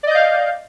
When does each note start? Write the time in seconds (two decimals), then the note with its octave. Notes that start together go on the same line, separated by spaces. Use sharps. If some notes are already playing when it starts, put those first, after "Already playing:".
0.03 D5
0.07 D#5
0.11 G6
0.15 F5